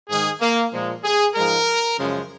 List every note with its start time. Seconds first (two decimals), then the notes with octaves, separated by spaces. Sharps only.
0.09 G#2 D#3 G#3 G#4
0.41 A#3
0.73 A#2 F3 G#3
1.04 G#4
1.35 G#2 F3 G#3 A#4
1.99 F#2 C#3 F3 G#3